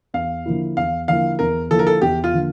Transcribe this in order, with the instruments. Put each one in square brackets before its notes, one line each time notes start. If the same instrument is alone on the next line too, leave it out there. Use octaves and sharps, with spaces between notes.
[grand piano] E2 [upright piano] F5
[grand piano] D3 F3 A#3 E4
[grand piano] E2 [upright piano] F5
[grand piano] D3 F3 A#3 E4 [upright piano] F5
[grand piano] E2 [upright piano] A#4
[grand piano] D3 F3 A#3 E4 [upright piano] A4
[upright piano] A#4
A4
[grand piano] E2 [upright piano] G4
[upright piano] F4
[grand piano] D3 F3 A#3